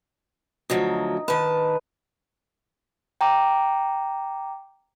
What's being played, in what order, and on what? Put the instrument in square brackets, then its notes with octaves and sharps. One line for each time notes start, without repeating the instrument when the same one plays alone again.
[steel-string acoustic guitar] D2 F3 F#3 [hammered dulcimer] D#4
[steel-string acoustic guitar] D#3 A5 [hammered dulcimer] B4
[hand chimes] G5 A#5 D6